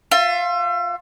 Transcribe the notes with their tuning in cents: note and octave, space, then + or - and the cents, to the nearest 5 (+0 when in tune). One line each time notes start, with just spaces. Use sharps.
F4 +15 E5 +40